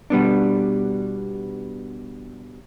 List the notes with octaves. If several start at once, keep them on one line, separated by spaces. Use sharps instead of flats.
B2 G3 B3 D4